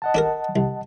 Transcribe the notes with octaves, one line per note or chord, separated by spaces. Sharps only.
D#5 F#5 A5
D4 A4 A#4
C2